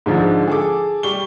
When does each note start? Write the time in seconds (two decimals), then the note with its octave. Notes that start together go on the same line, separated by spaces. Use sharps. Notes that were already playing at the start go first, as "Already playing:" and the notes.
0.06 G#2 D3 F3
0.48 G#4 A4 D6
1.03 G3 C#6 G7